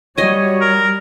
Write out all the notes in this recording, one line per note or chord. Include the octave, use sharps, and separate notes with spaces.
G3 F#4 C#5 D#5 G#5
A#4